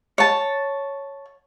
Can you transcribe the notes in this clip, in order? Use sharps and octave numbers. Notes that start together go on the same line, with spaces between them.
C#5 A5